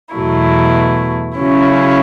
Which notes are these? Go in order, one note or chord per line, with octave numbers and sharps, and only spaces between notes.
E2 B2 F#3 A3 E4
C#3 F#3 C#4 E4